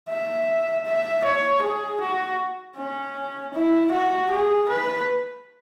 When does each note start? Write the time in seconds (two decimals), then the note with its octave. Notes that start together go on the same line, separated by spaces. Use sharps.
0.09 E5
0.85 E5
1.24 C#5
1.62 G#4
2.01 F#4
2.77 C#4
3.54 E4
3.92 F#4
4.31 G#4
4.69 B4